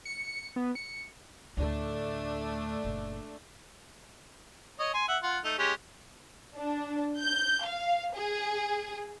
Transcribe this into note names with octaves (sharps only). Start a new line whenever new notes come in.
C#7
B3
C#7
D2 A2 A3 D4
F#1 A#2
C#5 D#5
G#5 C6
E5 F#5
F4 F#5
A3 D#4
G#3 C#4 G4
D4
G6
F5
G#4